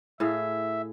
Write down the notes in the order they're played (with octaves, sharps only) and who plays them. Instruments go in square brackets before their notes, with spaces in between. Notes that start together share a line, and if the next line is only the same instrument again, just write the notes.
[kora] A2 G#4 F5 [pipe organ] E5